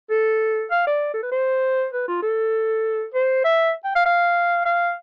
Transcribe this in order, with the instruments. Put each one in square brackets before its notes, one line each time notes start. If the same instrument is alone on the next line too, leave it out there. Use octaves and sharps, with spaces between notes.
[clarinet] A4
F5
D5
A4
B4
C5
B4
F4
A4
C5
E5
G5
F5
F5
F5